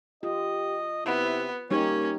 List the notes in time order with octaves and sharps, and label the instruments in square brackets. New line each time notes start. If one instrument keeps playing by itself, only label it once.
[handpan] F4 [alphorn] G4 [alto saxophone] D#5
[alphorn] C3 [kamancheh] B3 [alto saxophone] E4
[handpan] G3 D#4 G4 [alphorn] A#3 [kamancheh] C#4 [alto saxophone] C#5